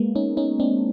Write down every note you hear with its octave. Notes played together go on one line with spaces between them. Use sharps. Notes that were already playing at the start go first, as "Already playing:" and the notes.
Already playing: G#3 A#3 B3
C#4 D#4
C#4 D#4
C4 D4